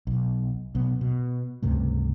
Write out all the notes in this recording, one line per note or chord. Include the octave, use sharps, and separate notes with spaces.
B1
B1 B3
B2
C#2 G2 C3 A3